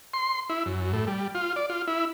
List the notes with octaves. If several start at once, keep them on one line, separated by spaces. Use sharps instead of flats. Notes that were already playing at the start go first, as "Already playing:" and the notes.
C6
E4
F#2
A2
G3
F4
D5
F4
E4